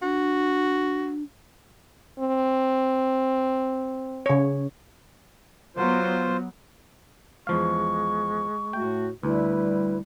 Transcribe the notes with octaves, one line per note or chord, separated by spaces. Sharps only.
D4 F#4
C4
C#3 C#5
F#3 B3 F4 C5
E2 F3 G#3 F5 C#6
A2 A3 F#4 G5
D2 G3 E4 B4